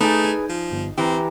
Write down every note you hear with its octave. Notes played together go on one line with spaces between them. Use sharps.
A3 D#4 G#4 B4 D5
G#5
F3
G1
E3 C4 G4 B4 A#5